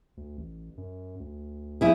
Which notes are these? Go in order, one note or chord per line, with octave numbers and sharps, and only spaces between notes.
D2
A1
F#2
D2
F2 E4 G#4